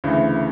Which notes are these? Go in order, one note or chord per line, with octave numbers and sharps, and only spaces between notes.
D2 C#3 E3